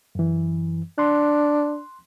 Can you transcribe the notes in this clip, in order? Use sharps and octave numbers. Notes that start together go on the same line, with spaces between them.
F#2 E3
D4 C6 F#6